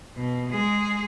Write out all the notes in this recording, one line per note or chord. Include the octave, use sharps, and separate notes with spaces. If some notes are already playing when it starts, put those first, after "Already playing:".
B2
G#3 G#4